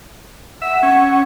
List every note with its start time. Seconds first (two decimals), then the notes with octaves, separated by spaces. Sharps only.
0.62 E5 F#5
0.83 C#4